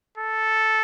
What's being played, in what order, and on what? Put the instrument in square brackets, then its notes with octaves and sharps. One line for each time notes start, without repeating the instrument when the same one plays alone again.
[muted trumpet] A4